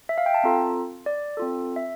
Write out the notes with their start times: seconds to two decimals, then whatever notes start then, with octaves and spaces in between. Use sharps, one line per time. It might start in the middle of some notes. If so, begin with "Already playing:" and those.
0.09 E5
0.18 F5
0.26 G5
0.34 A5
0.43 C4 F4 A4 A#5
1.06 D5
1.37 C4 F4 A4
1.76 E5